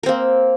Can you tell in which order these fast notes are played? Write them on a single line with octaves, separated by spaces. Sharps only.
A#4 C4 A#3